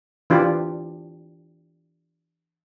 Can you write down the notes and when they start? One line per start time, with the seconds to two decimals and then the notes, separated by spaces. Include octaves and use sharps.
0.30 E3 D4 F4 G4